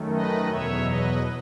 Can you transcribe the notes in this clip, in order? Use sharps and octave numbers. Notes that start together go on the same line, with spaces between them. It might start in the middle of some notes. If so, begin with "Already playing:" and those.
Already playing: F#2 D#3 A3
B4 D#5
E2 B2 F#3 C#5 E5
B4 D#5